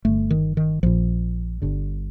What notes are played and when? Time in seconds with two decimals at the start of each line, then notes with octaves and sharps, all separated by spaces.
0.05 G1 G2 D3 A3
0.31 D#3
0.57 D#3
0.83 A#1 A#2 F3
1.62 G1 G2 D3